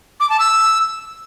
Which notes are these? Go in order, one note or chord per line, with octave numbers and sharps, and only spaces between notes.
D6
A5
E6